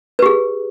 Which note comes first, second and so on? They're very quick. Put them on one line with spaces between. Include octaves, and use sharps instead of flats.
B4 G4 G#4